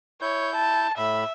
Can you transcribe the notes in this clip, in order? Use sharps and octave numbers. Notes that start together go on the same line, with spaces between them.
E4 C#5 G6
A5
A2 E5 B5